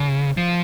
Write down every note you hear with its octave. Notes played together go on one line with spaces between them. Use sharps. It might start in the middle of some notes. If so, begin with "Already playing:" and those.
Already playing: C#3
F3